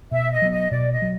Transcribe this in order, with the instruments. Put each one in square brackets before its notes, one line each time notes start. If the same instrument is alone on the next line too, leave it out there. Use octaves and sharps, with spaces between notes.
[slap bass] B2 [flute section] E5
[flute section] D#5
[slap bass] F#3 B3
[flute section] D#5
[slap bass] B2 [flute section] D5
[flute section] D#5
[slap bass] F#3